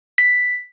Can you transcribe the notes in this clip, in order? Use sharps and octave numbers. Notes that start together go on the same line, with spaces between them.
B6